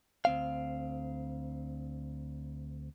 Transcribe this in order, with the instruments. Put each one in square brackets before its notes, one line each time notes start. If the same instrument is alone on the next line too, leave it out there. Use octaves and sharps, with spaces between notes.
[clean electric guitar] D2 C4 F5